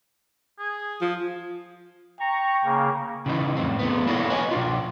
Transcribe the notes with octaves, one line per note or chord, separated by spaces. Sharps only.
G#4
F3
G5 A#5 C#6
C#3 A#3
C#3 E3 D#4
F2 A2 C4
G#3 A3 B3
A#3 D4 E4 F#4 A4 C#5
B4 C#5 D#5 G#5
B2 D4 F4